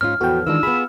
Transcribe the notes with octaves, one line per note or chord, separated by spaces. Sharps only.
G#2 C#4 F4 F6
E2 A2 F3 B3 F#4 G5
D#3 E3 G#3 D4 F4 E6
B3 G#4 B5